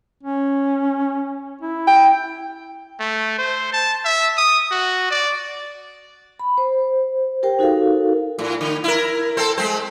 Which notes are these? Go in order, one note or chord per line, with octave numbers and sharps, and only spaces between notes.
C#4
E4
G5
A3
C5
A5
E5
D#6
F#4
D5
B5
C5
G4 A#4 C5 G5
D#4 F#4 A4 A#4 F5
A2
D3
E4 A#4
C4 A4 C5
G#3 C4 C5